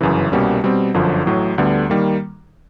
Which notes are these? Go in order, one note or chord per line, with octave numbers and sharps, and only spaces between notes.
G1 F#2 C#3 E3
C2 B2 G3 A#3 C#4
B2 G3 C4
G1 F#2 D3 F3
A1 A2 F#3
D2 D3 G3 B3
D#3 G3 A#3